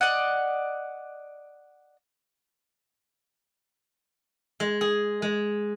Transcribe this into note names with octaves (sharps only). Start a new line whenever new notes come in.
D5 D#5 F#5
G#3
G#4
G#3